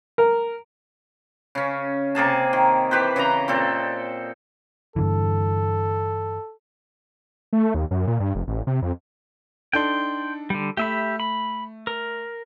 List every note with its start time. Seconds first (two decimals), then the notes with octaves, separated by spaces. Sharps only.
0.18 A#4
1.55 C#3 C#4
2.15 C3 A#3 G#4 A5
2.53 D#3
2.91 E3 G4 B4 C5
3.16 C#3 E3 D#5 A#5
3.48 A#2 C4 A4
4.96 G2 D3 E3 A4
7.53 A3
7.74 D#2
7.91 F#2
8.07 A#2
8.20 G2
8.35 F1
8.48 A1
8.67 C3
8.82 F2
9.73 D4 D#4 A4 G5 C6
10.50 D3 G3
10.77 A3 G4 E5 B5
11.20 B5
11.87 A#4